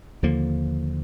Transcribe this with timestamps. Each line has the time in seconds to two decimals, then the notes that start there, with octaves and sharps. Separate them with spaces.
0.23 D#2 D3 F3 A#3